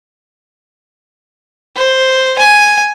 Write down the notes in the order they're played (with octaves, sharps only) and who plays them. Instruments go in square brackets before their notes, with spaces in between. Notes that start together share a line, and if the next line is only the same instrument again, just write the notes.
[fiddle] C5
G#5